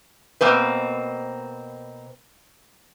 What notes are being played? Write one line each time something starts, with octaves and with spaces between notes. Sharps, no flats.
B2 A#3 C4 B4